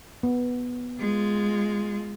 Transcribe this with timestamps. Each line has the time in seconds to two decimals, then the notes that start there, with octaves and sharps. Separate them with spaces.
0.23 B3
1.00 G#3 F4